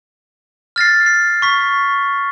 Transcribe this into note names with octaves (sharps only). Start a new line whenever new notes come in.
F6 A6 A#6 C7
C7
C#6 B6